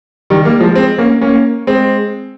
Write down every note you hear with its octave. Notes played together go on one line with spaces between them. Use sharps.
D#3 G3
G3 A#3
F3 G#3
G#3 C4
A#3 C#4
A#3 C#4
G#3 C4